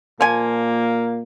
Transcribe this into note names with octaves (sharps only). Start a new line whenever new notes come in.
A#2 F3 A#3 G#5